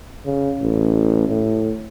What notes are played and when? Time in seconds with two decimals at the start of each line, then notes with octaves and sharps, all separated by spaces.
0.25 C#3
0.62 A1
1.29 A2